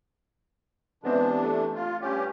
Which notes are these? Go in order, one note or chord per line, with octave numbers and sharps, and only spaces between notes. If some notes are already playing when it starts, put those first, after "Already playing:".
C3 E3 G#3 B3 C4 D4
A3
F4
G2 C#4 G4